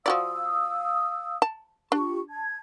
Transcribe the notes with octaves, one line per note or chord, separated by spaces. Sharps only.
F3 F#4 D5 F5 D#6 E6
A5
D4 F4 G4 C#6
A5 G#6